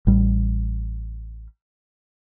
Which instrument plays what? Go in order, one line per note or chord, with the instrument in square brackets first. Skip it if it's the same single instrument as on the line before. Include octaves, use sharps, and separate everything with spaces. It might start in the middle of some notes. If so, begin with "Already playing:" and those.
[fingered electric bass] A1 G3